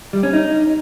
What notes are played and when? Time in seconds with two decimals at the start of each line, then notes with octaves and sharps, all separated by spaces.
0.13 G3
0.23 C#4
0.33 D#4